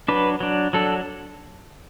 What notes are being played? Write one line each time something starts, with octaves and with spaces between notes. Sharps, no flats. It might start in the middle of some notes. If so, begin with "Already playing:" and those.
F#3 D4 B4
F#3 D4
F#3 D4 A4